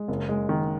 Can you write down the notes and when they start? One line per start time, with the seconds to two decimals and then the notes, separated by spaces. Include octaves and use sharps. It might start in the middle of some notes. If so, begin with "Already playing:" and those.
Already playing: G#3
0.08 F#1
0.29 G#3
0.49 D#3